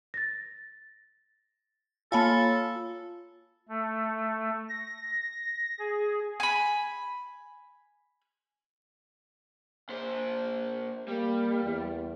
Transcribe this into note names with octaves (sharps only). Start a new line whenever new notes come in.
A6 A#6
A#3 F4 A4 C#5 F5 G#5 A5 B5
A3
A#6
G#4
G#5 B5
A#2 C5
G3 A#3
E2